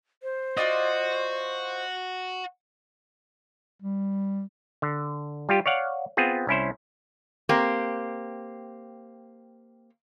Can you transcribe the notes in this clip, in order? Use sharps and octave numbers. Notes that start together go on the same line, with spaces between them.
C5
F4 F#4 D5 D#5
G3
D3
G3 F4 G4
C#5 D5 F5 F#5
B3 C4 F4 G#4
C2 C#4 E4 C5
A#3 C4 G4